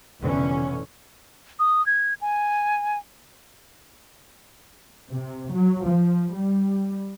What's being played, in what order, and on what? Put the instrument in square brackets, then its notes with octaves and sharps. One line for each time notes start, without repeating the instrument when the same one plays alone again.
[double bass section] F1 B2 D3 E3 C#4
[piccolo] D#6
G#6
G#5
[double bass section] C3
F#3
F3
G3